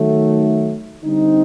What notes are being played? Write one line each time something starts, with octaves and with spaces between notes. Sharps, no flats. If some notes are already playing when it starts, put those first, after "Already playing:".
Already playing: D#3 F#3 A3
D3 G3 C4 D#4